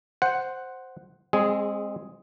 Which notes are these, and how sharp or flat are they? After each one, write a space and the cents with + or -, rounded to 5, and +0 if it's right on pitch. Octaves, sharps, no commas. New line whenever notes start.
C5 +0 F#5 +0
G#3 -20 C4 +15 G#4 +5